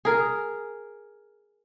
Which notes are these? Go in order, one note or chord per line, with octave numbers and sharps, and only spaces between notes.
G#4 A#4